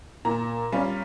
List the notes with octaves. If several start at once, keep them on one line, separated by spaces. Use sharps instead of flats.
A#2 A#5
G3 C#4 F4